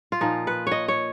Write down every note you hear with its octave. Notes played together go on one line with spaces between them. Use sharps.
F4
A#2 F3 D#4
B4
C#5 D#5
C#5